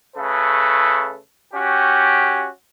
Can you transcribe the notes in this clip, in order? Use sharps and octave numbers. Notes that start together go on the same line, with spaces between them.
C#3 A3 A4 B4
C#4 F#4 G4